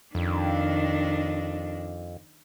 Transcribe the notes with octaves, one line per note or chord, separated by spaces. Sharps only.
F2 D#3 D4